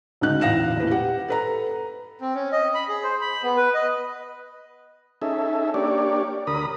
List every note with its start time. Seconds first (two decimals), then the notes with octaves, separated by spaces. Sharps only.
0.21 D2 C#3 G#3 D#4 F#6
0.41 A#1 E2 F5 A#6 E7
0.76 D#1 A2 B4
0.91 G4 F#5
1.28 A4 B4 A#5
2.21 C4
2.35 C#4
2.52 D#5
2.75 B5
2.89 G#4
3.03 C5
3.21 B5
3.43 B3
3.57 B4
3.74 D#5
5.22 C#4 D#4 G#4 A4 E5
5.74 A#3 D4 G4 C#5 D5
6.47 D2 A#4 B5 D#6